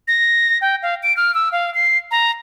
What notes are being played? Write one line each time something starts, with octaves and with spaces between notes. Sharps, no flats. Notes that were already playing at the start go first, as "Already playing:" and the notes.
A#6
G5
F5
D7
F6
E6
F5
C7
A#5